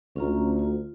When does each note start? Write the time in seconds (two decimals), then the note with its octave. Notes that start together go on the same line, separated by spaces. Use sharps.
0.16 D2 C#4 F4 A#5
0.59 F4